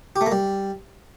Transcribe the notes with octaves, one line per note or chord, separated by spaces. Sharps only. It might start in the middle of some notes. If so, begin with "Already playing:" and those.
G4
A3
A#3
G3